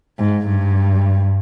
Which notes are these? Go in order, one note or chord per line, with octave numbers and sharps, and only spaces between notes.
G#2
G2